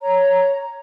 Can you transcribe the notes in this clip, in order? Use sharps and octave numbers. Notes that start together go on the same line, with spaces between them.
C#5 A#5